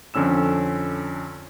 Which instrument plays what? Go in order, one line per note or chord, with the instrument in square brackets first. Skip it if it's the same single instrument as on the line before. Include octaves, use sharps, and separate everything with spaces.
[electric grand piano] F2 D3 C#4 E6 E7